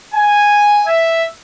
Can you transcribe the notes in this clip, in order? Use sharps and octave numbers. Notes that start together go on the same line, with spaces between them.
G#5
E5